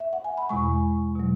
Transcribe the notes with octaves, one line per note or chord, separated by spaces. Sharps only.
E5
F#5
G#5
B5
E2 B2 G#3 G#5 C#6
B2 F#3